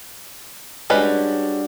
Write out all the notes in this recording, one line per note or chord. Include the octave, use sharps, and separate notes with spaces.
G3 G#3 C#4 D4 F#4 B4